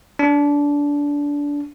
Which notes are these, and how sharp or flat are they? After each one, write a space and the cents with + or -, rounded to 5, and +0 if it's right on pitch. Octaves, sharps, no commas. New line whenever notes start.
D4 -20